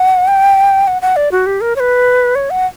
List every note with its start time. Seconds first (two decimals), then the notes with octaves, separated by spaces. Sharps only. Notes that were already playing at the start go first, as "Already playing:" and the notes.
Already playing: F#5
0.28 G5
0.87 F#5
1.02 F#5
1.16 D5
1.32 F#4
1.46 G4
1.61 A#4
1.76 C#5
1.80 B4
2.35 C#5
2.50 F#5